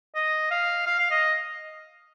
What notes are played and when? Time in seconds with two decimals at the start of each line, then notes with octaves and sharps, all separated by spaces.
0.15 D#5
0.51 F5
0.86 F5
0.99 F5
1.11 D#5